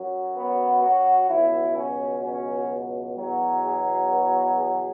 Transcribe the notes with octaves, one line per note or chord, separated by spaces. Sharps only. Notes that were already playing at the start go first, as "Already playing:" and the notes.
Already playing: F#2 F#3
B3
F#4
C#2 B2 F#3 E4
C#4
C#4
E2 B2 F#3
G#4
B4
G#4